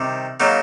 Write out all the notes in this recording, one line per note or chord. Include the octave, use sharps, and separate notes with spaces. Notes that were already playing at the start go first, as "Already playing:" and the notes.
Already playing: C3 D#3 G3
C#3 F#3 A#3 D#4